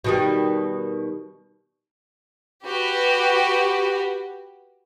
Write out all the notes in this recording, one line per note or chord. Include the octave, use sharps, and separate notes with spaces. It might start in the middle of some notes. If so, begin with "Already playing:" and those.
B2 D#3 G3
F#4 G4 B4